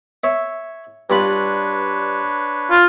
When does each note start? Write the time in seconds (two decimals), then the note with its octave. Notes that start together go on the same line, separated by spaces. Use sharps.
0.24 C#5 E5
1.10 G2 D4 F4 B4 C#5 B5
2.71 F4